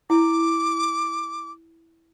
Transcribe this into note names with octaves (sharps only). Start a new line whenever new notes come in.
E4 D6